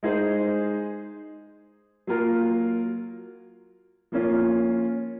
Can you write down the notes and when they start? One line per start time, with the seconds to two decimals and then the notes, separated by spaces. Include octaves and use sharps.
0.03 G#3 D#4 G#4 C5
2.07 F#3 A#3 F4 A#4
4.12 F3 A#3 C#4 F4